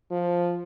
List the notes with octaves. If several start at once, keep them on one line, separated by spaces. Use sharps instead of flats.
F3